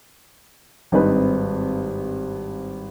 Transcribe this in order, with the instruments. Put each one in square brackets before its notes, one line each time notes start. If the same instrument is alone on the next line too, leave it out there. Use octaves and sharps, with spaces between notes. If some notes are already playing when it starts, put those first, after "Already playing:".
[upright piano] G#1 G2 C4 D#4 B4